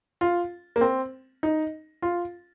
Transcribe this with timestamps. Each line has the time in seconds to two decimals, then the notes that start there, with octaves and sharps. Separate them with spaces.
0.21 F4
0.76 A#3
0.81 C4
1.43 D#4
2.02 F4